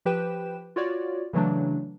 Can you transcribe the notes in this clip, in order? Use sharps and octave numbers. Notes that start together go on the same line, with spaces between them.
F3 G4 B4 G5 E7
F4 F#4 C#5 D5
C#3 E3 F#3 A3 D4